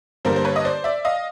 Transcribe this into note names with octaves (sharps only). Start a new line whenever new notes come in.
G2 D3 G3 A#3 A#4 C5
C5
B4 C#5
D#5
C5 D5
D5 E5
D#5 F5